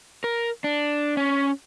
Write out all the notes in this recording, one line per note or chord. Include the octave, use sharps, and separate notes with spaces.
A#4
D4
C#4